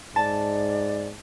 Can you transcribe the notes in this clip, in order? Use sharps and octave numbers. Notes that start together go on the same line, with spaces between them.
G#2 D5 A5